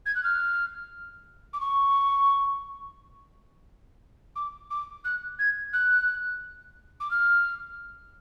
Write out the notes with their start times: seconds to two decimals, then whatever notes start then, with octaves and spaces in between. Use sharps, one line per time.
0.06 G#6
0.15 F#6
0.23 F6
1.53 D6
1.60 C#6
4.36 D6
4.71 D6
5.05 F#6
5.39 G#6
5.73 F#6
7.00 D6
7.11 F6